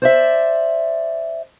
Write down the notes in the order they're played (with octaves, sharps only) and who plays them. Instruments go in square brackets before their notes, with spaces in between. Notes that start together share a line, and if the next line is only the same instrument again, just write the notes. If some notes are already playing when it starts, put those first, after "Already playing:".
[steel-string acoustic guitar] C5 D5 E5